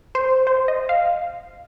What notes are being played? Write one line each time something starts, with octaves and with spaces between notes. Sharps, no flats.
C5
C5
D#5
F5